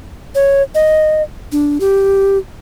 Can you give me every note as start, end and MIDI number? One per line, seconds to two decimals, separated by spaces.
0.35 0.62 73
0.75 1.22 75
1.52 1.78 62
1.80 2.37 67